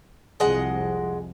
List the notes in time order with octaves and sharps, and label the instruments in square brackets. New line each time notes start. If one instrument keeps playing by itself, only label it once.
[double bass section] C2 F2 [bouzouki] G#3 D#5 F#5